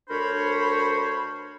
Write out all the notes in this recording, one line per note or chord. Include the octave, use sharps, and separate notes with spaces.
D2 D4 A#4 C5 C#5 B5